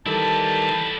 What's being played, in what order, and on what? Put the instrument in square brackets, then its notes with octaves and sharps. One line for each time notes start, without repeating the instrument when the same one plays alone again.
[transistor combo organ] D#3 E3 G3 [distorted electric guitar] E4 D5 [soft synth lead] A4 [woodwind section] A5